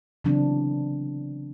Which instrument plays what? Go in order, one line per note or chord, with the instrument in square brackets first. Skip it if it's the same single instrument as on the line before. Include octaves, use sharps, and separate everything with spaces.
[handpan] C#3 E3 F#3 B3 C4 D4